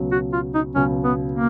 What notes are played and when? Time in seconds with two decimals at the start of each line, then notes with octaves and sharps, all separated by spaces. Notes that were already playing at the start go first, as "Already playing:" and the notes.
Already playing: C#2 B2 F#3
0.12 F#4
0.33 F4
0.55 D#4
0.75 C#2 B2 F#3 C#4
1.04 B3
1.32 A#3